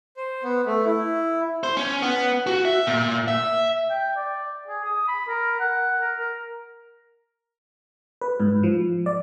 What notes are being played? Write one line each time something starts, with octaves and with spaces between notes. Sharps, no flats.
C5
B3
A3
E4
C5
C#4
B3
F#4
E5
A#2
E5
G5
D5
G#4
D#6
B5
A#4
F#5
A#4
A#4
B4
G#2
F3
D5